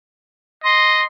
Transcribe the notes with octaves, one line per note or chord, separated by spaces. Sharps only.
D#5 C6